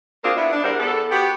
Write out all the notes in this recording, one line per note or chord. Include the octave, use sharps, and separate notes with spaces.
A#3 C4 D4 F4 G#4
B3 D4 E4
D4
E2 G3 A#4 C5 F#5
E2 B3 A4
B3 F#4 G4